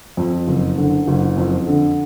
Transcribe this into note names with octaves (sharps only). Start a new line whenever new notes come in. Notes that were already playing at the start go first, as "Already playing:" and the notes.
F2
F#1
D3
F#1
F2
D3